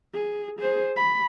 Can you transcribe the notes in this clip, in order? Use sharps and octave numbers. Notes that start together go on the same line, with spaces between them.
G#4
G#4 C5
B5